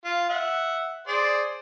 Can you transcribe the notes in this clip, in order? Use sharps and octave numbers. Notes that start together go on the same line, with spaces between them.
F4
E5 F#5
G#4 C5 D5